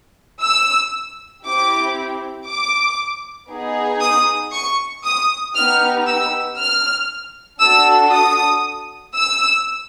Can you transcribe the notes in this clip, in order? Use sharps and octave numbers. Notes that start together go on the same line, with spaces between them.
E6
C4 E4 G4 D6
D6
B3 D#4 G#4
D#6
C#6
D#6
B3 D#4 G4 F6
E6
F6
D4 F#4 A4 E6
D#6
E6